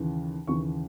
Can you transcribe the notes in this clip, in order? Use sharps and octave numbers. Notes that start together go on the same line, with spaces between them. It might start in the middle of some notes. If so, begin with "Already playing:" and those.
Already playing: D#2 C#3 E3
D#2 C#3 E3 C#6